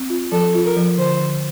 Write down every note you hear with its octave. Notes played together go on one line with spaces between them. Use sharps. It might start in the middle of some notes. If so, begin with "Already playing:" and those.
Already playing: C4
F4
F3 A4
F4
A#4
F3
D3 C5
D3